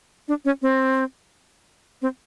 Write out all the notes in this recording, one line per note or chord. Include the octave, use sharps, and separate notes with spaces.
D4
C#4
C4
C4